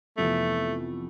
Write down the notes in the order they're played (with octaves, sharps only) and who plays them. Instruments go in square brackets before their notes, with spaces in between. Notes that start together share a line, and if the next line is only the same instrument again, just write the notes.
[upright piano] F2 C3 E3 B3 [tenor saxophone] A3